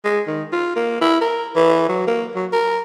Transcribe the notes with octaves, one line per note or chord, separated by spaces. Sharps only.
G#3
D#3
F4
A#3
E4
A#4
E3
F#3
A#3
F#3
A#4